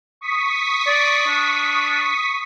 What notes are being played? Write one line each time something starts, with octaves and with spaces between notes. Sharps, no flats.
C#6 D#6 B6
D5
D4